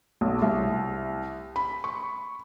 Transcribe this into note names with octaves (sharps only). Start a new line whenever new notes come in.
B1
C2
B5
C#6